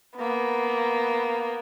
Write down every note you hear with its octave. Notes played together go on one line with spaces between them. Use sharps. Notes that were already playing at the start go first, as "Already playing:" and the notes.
A#3 B3